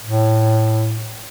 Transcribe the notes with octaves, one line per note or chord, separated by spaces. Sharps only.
A2